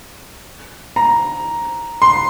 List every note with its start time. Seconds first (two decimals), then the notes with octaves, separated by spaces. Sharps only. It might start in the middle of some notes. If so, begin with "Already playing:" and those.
0.96 A#5
2.02 C6